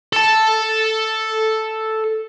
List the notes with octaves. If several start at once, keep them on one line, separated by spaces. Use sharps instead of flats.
A4 A5